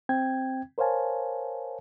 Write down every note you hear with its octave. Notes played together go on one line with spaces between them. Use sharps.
C4 G5 G#6
A#4 C5 C#5 F5 G#5 A5